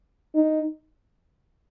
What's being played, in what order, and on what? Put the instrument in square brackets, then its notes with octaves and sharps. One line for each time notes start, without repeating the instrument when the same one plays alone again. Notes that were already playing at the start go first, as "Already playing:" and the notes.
[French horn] D#4